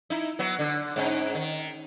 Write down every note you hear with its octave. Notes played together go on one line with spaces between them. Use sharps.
D#4 E4
F#3 B3
D3
G#2 C#4 D#4
D#3